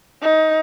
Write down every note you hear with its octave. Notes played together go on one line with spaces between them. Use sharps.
D#4